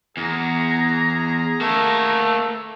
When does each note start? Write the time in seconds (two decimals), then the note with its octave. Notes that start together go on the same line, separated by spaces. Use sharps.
0.17 E2 G#4 A#5
1.61 A3 A#3 E5